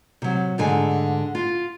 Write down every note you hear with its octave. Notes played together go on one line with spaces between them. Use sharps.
C3 F#3
D2 G#2 D3 G#5
F4